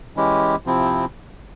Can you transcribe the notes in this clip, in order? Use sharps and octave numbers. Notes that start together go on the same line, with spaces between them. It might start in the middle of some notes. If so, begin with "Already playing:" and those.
E3 G#3 C#4 E4 G4
C3 F3 C4 E4